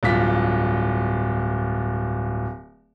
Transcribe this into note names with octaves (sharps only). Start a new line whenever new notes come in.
D1 G2 F4 B6